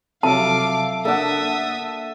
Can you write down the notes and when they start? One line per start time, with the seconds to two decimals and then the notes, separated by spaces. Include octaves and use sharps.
0.23 C3 F3 F#3 A4 E5 F5 A5 D6
1.05 A#3 D4 A4 E5 F#5 D#6